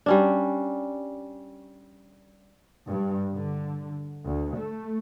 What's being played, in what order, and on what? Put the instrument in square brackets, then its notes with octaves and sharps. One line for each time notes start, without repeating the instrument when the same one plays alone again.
[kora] G3 C#4 D4
[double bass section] G2
D3
D2
A3